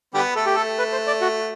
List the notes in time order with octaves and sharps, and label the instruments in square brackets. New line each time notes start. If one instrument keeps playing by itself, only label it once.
[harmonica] D3 G3 B3 [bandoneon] G4
[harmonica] A3 [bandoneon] A4
[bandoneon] G4
A4
B4
C5
D5
F#4